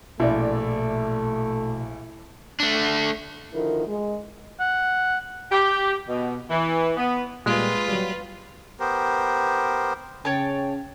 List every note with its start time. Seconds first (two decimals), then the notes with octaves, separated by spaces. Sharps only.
0.20 A#1 B2 A3 E4 D5
2.60 A3 D4
3.54 D3 D#3 F3 E4 A#4
3.87 G#3
4.60 F#5
5.51 G4
6.08 B2
6.50 E3
6.97 B3
7.46 A#2 G3 G#3 F4 B4
7.88 F#3 G3
8.80 B3 G4 A#4 C5
10.25 C#3 C#4 C#5 G5 A5